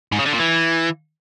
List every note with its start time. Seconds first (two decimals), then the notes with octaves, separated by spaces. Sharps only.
0.12 G#2
0.19 C#3
0.26 D3
0.33 A#2
0.40 E3